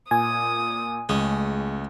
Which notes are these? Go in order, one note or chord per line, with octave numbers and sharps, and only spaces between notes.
A#2 G#5 D#6
C#2 G#3 A3 C#4 D#6